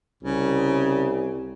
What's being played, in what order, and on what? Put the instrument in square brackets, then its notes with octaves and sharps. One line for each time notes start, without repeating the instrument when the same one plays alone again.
[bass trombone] C2 [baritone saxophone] C#3